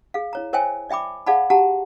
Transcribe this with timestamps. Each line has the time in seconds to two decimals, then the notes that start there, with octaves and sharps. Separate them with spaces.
0.14 G#4 F5
0.33 E4 C#5 A#5
0.53 A#4 C5 C#5 E5 G5 G#5
0.90 D5 E5 G5 B5 D6
1.27 G#4 D5 F5 F#5 A5 B5
1.50 F#4 G4 F#5 A5 A#5